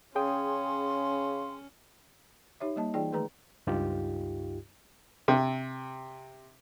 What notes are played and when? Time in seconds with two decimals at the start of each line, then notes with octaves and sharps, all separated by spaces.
0.16 C#3 C#4 G#4 G5 C6 D#6
2.60 D#4 G4 C#5 E5
2.76 G3 A#3 D#5 A5
2.94 E3 D#4 F4 G#4 D5 G5
3.12 D#3 A3 G#4 B4 A#5
3.67 C#2 G2 D#4 F4 G4
5.28 C3